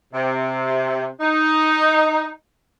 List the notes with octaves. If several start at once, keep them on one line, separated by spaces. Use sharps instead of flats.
C3
D#4